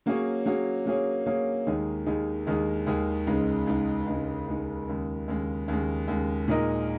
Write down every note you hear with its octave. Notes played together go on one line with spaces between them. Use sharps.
F#3 A#3 C#4 G#4 C#5
F#3 A#3 C#4 G#4 C#5
F#3 A#3 C#4 G#4 C#5
F#3 A#3 C#4 G#4 C#5
D#2 D#3 G#3 D#4 G#4
D#2 D#3 G#3 D#4 G#4
D#2 D#3 G#3 D#4 G#4
D#2 D#3 G#3 D#4 G#4
C#2 C#3 G#3 D#4
C#2 C#3 G#3 D#4
C#2 C#3 G#3 D#4
C#2 C#3 G#3 D#4
D#2 C#3 G#3
D#2 C#3 G#3
D#2 C#3 G#3
D#2 C#3 G#3
A#2 G#3 D#4 A#4 D#5